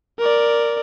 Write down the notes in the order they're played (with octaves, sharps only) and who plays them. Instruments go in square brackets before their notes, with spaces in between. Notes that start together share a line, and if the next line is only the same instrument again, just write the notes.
[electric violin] A#4 D5